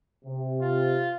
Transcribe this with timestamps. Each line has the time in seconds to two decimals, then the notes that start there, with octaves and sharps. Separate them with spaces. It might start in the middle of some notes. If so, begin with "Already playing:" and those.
0.25 C3
0.62 F4